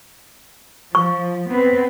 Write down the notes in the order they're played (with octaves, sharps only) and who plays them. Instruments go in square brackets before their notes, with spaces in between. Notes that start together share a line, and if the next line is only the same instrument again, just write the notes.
[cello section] F3 [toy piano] C#6
[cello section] B3 C4 B4